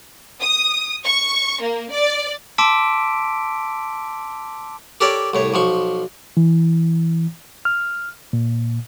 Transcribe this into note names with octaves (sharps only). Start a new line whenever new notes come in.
D#6
C#6
A#3
D5
A5 C6 D6 E6 B6 D7
G4 A4 A#4 C#5 D5
C2 A2 C#5
B1 F3 C#6
E3
F6
A#2